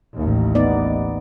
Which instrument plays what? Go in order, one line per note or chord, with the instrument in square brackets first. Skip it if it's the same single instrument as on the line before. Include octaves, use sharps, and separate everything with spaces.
[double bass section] A1 D#2
[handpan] B3 D#4 D5